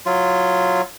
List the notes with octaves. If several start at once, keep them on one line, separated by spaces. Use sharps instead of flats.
F#3 F4